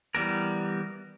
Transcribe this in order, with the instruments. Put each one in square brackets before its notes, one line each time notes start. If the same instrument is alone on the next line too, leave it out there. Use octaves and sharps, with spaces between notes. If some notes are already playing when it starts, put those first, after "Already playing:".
[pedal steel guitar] E3 G3 B3 A#4